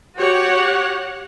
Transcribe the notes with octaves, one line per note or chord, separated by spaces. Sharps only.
F#4 G4 C#5 F#5